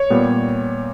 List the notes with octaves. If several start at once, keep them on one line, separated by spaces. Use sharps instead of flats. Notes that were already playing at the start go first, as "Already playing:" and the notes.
Already playing: C#5
A#2 G3 B3